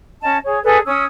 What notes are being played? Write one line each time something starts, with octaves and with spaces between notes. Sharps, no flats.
C#4 D#5 A5
G#4 C#5
G#4 A4 B4 D5
C#4 D#6 E6